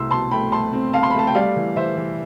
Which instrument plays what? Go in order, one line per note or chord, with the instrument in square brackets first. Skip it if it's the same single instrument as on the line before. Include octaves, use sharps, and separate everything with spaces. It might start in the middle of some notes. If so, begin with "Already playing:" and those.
Already playing: [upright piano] C2 A3 C6 E6
B2 A5 C6
A3 G5 B5
A3 A5 C6
C4
C4 F5 A5
C6
B5
A3 A5
G5
G3 D5 F5
E3
E3 C5 E5
E3